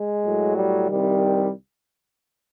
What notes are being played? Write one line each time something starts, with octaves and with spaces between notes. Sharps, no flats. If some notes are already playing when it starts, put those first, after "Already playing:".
Already playing: G#3
A2 F#3
G3
C2 C3 D#3 G3